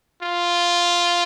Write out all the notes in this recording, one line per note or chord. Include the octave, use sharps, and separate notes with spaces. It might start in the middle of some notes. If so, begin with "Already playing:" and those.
F4